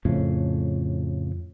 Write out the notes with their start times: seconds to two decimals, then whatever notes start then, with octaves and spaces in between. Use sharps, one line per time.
0.05 F2 A2 C#3